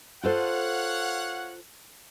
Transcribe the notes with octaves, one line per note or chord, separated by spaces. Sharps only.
F4 A4 C5 C#5 F5 F#5